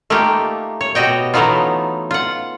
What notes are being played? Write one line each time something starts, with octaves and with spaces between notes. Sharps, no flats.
A3 A#3 D#4 F4 G4
C#5
B2 F#4 G4 D#5 G5
E3 F#3 A3 B3 D#4 F4
F4 F#5